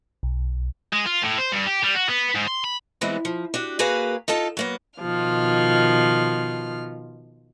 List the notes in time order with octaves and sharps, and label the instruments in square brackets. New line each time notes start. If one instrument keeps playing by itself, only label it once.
[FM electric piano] B1
[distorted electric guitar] G#3
F4
A2
C5
G2
G4
G3
F#4
B3
G#2
C6
B5
[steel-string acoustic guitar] E3 G3 G#3 B3 C4
F3
D4 F#4 G4
A#3 F#4 G#4 A#4 B4 F5
D#4 F4 A4 A5
F#3 A#3 B3
[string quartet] B2 D#3 F3 F4 F6